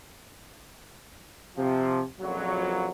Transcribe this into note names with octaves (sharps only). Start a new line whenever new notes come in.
C3 F3
A#1 F2 A#2 C#3 F#3